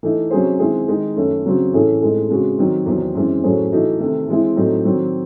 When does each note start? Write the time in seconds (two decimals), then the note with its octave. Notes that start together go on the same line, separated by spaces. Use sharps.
0.03 E3 A3 D#4
0.31 C3 F#3 C#4 G#4 C5
0.59 D#3 G#3 C4 E4 G#4
0.88 D#3 G#3 D#4
1.16 F#2 D#3 A3 C#4
1.45 C#3 F#3 C4
1.73 A2 E3 A3 C#4 G#4
2.01 A2 G#3 C4 D#4
2.29 C#3 G#3 C4 F#4
2.58 D#3 F#3 C4 D#4
2.86 E2 C3 D#3 F#3 C4
3.15 F#2 E3 G#3 C4
3.44 A2 F#3 C#4 G#4 C5
3.72 E3 A3 D#4 F#4
3.99 C3 D#3 A3
4.28 E3 G#3 C4 E4
4.56 A2 F#3 C4 D#4
4.85 D#3 F#3 C4